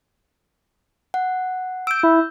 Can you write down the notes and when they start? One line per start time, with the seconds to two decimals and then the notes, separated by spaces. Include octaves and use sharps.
1.14 F#5
1.87 E6 G6 D7
2.03 E4